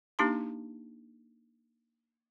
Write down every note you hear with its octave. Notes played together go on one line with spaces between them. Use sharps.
A#3 D4 D#4 G4 A5 C6